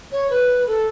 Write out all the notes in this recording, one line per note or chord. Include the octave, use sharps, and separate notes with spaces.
C#5
B4
A4